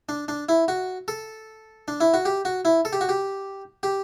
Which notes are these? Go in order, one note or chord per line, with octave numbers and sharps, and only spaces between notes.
D4
D4
E4
F#4
A4
D4
E4
F#4
G4
F#4
E4
A4
G4
F#4
G4
G4